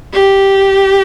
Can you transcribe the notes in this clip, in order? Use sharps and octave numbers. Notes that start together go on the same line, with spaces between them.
G4